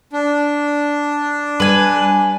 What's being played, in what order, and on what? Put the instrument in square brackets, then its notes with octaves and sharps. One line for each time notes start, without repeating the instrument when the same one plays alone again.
[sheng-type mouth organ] D4
[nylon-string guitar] G3 [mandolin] B4 G#5